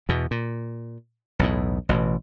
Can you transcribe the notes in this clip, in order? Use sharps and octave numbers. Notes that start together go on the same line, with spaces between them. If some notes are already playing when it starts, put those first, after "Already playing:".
E2 B2
A#2
B1 E2 A2
A1 B2 E3